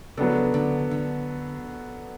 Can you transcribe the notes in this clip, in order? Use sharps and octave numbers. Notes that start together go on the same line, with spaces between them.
C#3 F#3 B3 D4 A4
D3
D3